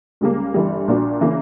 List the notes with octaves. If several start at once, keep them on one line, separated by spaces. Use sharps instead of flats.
C#2 C#3 G3 A#3
G1 G2 E3 G3
A#1 A#2 A#3 D4 F#4
C#3 E3 A#3